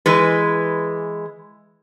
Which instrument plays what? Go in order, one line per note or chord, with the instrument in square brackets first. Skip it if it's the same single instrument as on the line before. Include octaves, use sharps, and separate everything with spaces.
[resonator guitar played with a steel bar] E3 G#3 B4